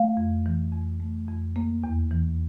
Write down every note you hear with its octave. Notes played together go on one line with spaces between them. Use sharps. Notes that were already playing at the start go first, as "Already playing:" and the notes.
Already playing: A3 F5
F2
E3
F2
A3
F2
A#3
E2
E3